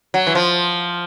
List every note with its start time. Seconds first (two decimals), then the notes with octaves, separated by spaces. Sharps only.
0.14 F#3
0.27 E3
0.35 F3